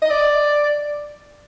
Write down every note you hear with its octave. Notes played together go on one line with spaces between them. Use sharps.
D#5
D5